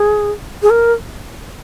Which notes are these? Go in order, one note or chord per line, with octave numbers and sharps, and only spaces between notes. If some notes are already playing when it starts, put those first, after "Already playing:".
Already playing: G#4
G#4
A#4